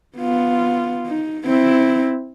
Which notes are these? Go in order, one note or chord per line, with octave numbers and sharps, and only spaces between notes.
B3 F4
D#4
C4 E4